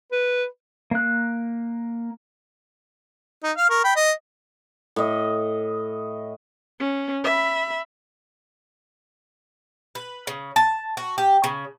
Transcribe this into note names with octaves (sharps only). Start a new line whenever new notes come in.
B4
A#3 F#6
D#4
F5 F6
A#4 C#6
G5 B5
D#5
A2 D#5
C#4
E5 B5
B4
C#3
A5
F#4
G4
C#3